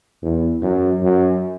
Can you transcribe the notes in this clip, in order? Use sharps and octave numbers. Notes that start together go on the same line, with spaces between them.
E2
F#2
F#2